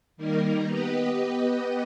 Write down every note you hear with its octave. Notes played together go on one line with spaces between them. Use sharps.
D#3 G3 A#3 D#4 A#4
B3 G4 B4 D#5